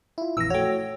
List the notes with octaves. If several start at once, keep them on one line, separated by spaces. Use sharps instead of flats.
E4 F4
A#1 F2 E3 E6 A#6
A3 F#4 C#5 G5